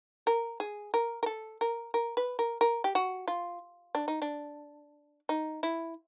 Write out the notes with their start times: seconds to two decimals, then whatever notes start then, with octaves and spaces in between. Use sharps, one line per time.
0.27 A#4
0.60 G#4
0.94 A#4
1.23 A#4
1.26 A4
1.61 A#4
1.94 A#4
2.17 B4
2.39 A#4
2.61 A#4
2.84 G4
2.95 F#4
3.28 F4
3.95 D4
4.08 D#4
4.22 D4
5.29 D#4
5.63 E4